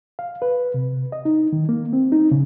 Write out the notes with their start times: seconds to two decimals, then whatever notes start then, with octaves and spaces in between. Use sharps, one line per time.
0.19 F5
0.42 B4
0.74 C3
1.12 D#5
1.25 D#4
1.53 D#3
1.69 A#3
1.93 C4
2.12 D#4
2.32 C#3